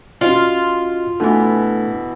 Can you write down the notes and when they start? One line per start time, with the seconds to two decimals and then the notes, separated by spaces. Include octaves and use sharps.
0.21 C#4 F4 F#4 D#5
1.20 B2 E3 A3 D4 A4